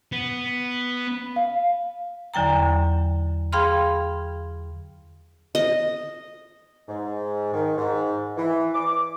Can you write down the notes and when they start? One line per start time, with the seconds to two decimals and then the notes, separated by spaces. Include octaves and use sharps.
0.12 B3
1.36 F5
2.34 E2 D3 F#3 G5 A#5
3.52 G#4 F5 G5 B5 C6 F6
5.55 D#5
6.88 G#2
7.53 D#3
7.77 G#2
8.37 E3
8.75 D6